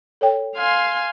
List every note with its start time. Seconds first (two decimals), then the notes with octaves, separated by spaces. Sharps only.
0.21 A4 C#5 G5
0.56 F5 G#5 C6